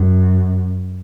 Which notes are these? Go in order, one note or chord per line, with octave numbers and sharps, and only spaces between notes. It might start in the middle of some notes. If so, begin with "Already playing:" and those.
Already playing: F#2